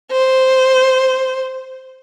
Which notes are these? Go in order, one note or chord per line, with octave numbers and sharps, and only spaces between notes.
C5